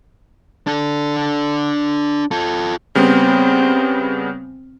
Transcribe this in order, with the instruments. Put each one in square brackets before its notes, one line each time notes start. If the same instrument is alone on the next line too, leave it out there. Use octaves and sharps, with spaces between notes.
[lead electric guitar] D4 A4
F4 A4
[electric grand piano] C#3 G3 B3 [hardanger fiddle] C4